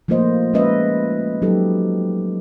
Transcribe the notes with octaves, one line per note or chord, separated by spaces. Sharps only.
F3 A3 A#3 F4 C5 D#5
G#3 C#4 B4 D#5 E5
F#3 D#4 G4 A4